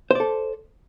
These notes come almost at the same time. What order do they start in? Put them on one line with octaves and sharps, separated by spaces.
C5 D5 A4